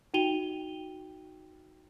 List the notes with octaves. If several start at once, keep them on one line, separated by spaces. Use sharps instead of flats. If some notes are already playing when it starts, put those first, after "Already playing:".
D#4 F#4 G5 D#7 F7 G7